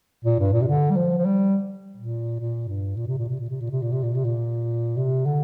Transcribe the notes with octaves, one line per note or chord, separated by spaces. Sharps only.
A#2
G2
A#2
C3
D3
G3
F3
F3
G3
A#2
A#2
G2
A#2
C3
A#2
C3
A#2
C3
A#2
C3
A#2
C3
A#2
C3
A#2
C3
D3